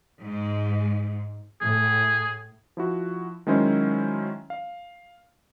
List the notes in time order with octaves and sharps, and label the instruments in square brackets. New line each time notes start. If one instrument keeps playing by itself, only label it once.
[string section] G#2
[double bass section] A2 [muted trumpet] G#4
[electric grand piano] F3 E4 F#4
D#3 F#3 G#3 C#4 E4 C5
F5